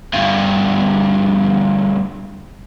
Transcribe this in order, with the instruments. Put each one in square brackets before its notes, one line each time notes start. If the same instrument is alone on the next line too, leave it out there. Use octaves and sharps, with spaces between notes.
[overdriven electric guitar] D2 G2